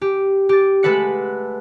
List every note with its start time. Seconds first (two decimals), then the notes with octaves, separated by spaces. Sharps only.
0.01 G4
0.49 G4 A6
0.83 G#3 A3 A4 B4 F#5 C#7